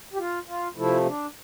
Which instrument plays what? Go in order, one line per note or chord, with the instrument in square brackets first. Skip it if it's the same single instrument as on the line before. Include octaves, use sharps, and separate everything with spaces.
[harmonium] G4
F4
F4
C3 F3 A3 E4
D4